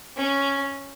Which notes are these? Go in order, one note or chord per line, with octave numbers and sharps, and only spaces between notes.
C#4